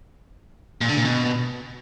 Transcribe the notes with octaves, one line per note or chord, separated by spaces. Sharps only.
A#2
D3
A#2
B2